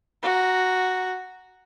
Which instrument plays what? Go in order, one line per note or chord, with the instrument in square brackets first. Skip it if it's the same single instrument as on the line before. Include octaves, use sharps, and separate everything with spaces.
[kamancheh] F#4 A#5